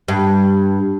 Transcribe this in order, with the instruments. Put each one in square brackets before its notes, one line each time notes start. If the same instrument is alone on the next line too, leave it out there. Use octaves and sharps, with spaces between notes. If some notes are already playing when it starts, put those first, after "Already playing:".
[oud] G2